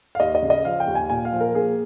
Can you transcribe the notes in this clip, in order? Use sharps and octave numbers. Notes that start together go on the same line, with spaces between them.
F5
D#2 D#5
D#5
C#3
D#5
F3 F5
G5
D#2
G#5
A#2 G#5
F5
F3
A#4
A#3 G#4